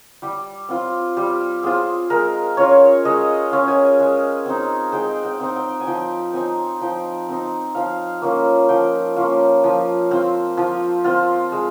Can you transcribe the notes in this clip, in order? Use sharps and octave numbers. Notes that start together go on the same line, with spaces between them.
G3 G4
C4 F4
G3 G4
C4 F4 G#4
G#3 A#4
C#4 F4 C#5
G#3 D#5
C#4 F4
G#5
G#3
C4 D#4
G#3 G5
G5
C4 D#4
G5
G#5
F3 G5
C4 D#4 G#5
F3 G5
C4 D#4
F3 F5
A#3 C#4 F4
F3 G5
A#3 C#4 F4
F3
C4 F4
F3
C4 F4
G#3